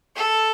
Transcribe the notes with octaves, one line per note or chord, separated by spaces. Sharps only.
A4